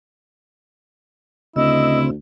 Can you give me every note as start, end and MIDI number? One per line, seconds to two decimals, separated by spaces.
1.56 2.16 38
1.56 2.10 49
1.56 2.10 60
1.56 2.06 64
1.56 1.99 75
1.56 2.10 88